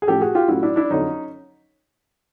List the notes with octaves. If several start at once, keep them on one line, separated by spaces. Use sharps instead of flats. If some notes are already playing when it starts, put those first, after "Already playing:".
G#4
A1 A2 F3 G4 A4
F#4 G#4
F4 G4
A1 A2 F#3 A3 E4 F#4
D4 E4
D4 E4
F2 D3 F#3 C#4 D#4